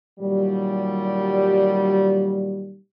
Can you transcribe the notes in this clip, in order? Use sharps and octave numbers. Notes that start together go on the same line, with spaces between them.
A#2 D#3 F#3 G3